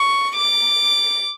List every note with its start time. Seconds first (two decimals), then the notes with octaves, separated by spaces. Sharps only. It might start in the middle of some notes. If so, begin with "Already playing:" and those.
Already playing: C#6
0.37 D6